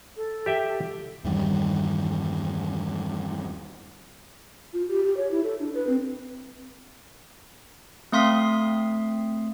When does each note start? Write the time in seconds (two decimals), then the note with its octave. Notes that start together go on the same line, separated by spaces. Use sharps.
0.16 A4
0.46 G4 E5 G5
1.24 E2 G2 D#3 G3
4.73 F4
4.88 G4
5.03 G4
5.16 C#5
5.30 E4
5.43 A4
5.59 D4
5.74 B4
5.87 C4
8.12 A3 C4 F5 C6 D#6 B6